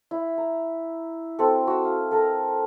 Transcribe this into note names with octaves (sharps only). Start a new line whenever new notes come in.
E4
A#5
C4 F#4 A4
F#4 E6
F5
A4 A#4 A#5